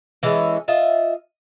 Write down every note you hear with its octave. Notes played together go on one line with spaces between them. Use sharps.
E3 G#3 C#4 A4
F4 D#5 E5